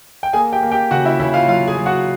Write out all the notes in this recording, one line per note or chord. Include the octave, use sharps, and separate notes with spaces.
G5
A#3 G#4 G#5
G4 G5
A#3
G4 G5
C#3 F#4 F#5
E4 E5
C#3 E4 E5
F4 F5
F#3 F4 F5
G#4 G#5
F#3
F#4 F#5